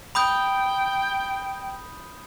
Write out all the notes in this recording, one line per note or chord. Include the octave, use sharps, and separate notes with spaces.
G5 B5 D#6 G6